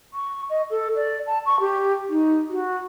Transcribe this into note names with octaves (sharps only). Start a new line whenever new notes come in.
C#6
D#5
A4
D5
A5
C#6
G4
D#4
F#4